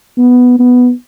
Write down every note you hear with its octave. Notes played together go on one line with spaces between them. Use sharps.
B3
B3